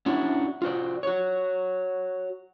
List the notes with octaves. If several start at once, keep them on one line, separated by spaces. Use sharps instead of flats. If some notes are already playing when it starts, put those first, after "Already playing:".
C#4 D4 E4 F#4
F4 F#4 C5 D5
F#4 C#5